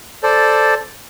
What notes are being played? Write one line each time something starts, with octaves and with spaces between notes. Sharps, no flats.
A4 C5 D5